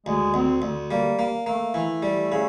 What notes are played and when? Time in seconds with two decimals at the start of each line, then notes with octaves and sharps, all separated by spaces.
0.06 D2 G#3
0.34 D2 C4
0.62 D2
0.91 G3 A#3
1.19 A#3
1.46 A3 A#3
1.74 E3 A3
2.02 G3
2.32 C#3